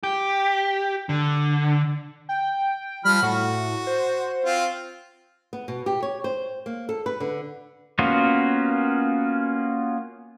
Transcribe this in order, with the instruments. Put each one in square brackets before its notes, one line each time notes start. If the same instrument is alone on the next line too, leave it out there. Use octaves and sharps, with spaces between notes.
[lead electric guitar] G4
D3
[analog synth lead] G5
[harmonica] F3 B5 F6 [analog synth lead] G3
[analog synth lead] A2 [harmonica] F#4
[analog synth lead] C5
[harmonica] C4 F4
[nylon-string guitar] B3
B2
G4
C#5
C5
A#3
A4
B4
D3
[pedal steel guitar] A#3 B3 C#4 F4 F#4